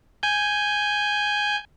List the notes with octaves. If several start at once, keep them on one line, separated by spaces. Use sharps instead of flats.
G#5 G6